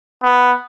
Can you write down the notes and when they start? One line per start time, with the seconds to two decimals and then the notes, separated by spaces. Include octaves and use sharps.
0.23 B3